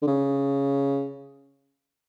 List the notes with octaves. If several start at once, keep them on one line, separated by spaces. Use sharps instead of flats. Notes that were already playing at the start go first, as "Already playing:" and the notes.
D3
C#3